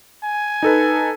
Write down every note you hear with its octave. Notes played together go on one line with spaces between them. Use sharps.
G#5
D#4 A4 B4